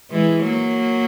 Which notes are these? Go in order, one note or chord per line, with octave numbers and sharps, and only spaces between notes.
E3 G#3
F#3 A#3